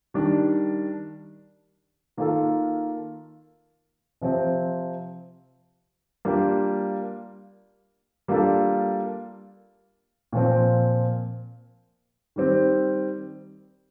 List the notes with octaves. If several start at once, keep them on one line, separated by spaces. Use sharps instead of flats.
D#3 G3 D4
D#3 A#3 F4 A4
C3 F3 C4
G3 A#3 D4 F4
G3 A#3 D4 F4 A4
A#2 F3 C4
D#3 G3 C4